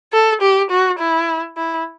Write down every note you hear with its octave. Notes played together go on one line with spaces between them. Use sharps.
A4
G4
F#4
E4
E4